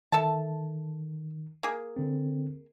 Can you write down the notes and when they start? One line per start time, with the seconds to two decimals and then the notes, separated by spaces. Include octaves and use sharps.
0.12 D#3 A4 E5 A5
1.63 A#3 G#4
1.96 D3 C4